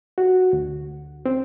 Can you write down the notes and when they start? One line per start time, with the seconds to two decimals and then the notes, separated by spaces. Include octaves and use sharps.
0.18 F#4
0.53 D2
1.26 C4